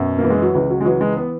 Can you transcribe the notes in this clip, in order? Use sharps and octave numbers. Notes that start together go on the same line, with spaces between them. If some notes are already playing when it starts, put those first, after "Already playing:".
Already playing: F#2 B2
E3 A#3
G#3
F#3
C#2 E3
F#3
G#3
E3 F#3
G#3
B3